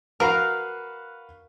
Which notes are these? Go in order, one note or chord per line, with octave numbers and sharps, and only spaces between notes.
F#4 A#4 B4 F5 F6 C7